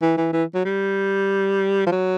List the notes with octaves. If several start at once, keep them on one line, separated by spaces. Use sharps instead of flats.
E3
E3
E3
F#3
G3
F3
F#3